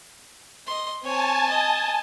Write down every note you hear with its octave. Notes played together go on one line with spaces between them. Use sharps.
D#5 C6
C4 C#5 G#5 A5
D#5